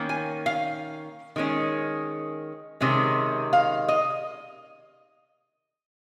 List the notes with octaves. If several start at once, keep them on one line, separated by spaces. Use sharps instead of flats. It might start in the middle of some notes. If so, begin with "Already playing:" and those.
Already playing: D#3 A#3 C#4
G#5
F5
D#3 G#3 C#4
C3 D#3 G#3 C#4
F5
D#5